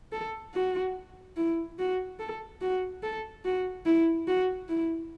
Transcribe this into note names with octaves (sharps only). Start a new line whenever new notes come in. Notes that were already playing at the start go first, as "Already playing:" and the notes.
A4
F#4
E4
F#4
A4
F#4
A4
F#4
E4
F#4
E4